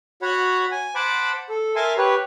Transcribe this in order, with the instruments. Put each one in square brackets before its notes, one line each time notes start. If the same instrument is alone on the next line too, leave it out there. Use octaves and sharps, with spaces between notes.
[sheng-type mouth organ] F#4 C#5 F#5 B5
G#5
C5 F#5 A5 B5 D6
A4
A#4 E5 G#5 A5 C6
G4 B4 C#5